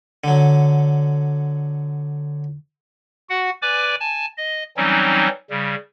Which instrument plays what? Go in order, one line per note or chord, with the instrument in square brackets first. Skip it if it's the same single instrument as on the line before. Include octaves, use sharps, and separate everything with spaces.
[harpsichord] D3 F#3
[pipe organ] F#4 F#5
B4 D5 G#5 D6
G#5 A5
D#5
E3 F#3 G3 C4 C#4 D#4
C#3 G3